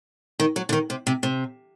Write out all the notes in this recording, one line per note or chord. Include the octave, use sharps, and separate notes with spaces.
D#3
F#3
D3
D#3
C3
C3
C3